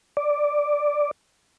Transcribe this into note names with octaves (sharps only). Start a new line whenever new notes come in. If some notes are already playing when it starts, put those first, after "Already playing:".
D5